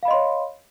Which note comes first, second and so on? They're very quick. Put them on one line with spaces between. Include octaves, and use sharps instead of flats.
F5 B5 D#5 C6 C#5